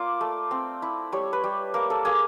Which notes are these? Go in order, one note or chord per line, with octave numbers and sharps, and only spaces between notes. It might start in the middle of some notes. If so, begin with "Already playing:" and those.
Already playing: A#3 F4 D5
A3
C4
E4
G3 C#5
B4
G3
A#3 A#4
A4
A#3 G#4